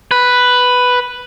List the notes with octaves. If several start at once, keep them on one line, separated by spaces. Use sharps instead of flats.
B4